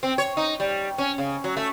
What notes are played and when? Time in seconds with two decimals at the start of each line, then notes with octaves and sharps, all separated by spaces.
0.03 C4
0.18 C#5
0.37 D#4
0.60 G3
0.98 C#4
1.18 C#3
1.44 F#3
1.57 A3